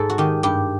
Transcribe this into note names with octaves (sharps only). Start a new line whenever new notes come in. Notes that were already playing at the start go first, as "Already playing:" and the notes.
Already playing: G#2 A4
F#4
D#3 G4
G2 G4